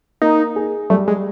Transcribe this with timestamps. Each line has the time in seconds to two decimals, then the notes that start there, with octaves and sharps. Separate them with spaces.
0.22 A#3 D#4
0.56 G#4
0.90 G3 A3
1.08 G#3